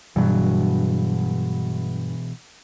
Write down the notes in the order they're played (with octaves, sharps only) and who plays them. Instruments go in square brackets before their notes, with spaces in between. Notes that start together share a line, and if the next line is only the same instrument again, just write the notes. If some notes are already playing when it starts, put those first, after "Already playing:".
[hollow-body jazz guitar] G2 F#3 [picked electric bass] B2 E3